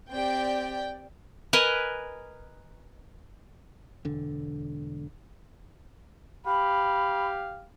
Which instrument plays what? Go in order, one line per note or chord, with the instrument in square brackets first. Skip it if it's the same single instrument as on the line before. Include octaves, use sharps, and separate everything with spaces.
[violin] C4 G4 [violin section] D5 G5
[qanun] A#4 B4 D#5 G#5
[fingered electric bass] E1 D3
[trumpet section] G4 F5 [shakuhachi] B5